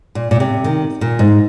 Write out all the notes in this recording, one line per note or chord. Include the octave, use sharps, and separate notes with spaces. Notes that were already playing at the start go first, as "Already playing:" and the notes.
A#2
A#2
C3
D#3
A#2
G#2